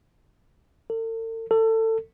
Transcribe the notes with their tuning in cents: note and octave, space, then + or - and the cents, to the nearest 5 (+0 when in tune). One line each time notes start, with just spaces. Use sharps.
A4 +45
A4 +25